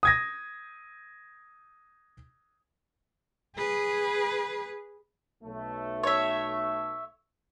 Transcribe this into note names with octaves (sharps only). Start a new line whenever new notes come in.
D#6 G#6 A#6
G#4 B4
B1 A3
C#5 E5